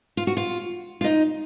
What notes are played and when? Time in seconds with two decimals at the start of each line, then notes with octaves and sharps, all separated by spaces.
0.17 F4
0.27 F#4
0.37 F4
1.01 F4
1.04 D#4